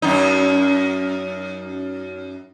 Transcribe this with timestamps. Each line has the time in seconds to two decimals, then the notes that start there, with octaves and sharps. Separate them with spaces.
0.02 F#2 D#4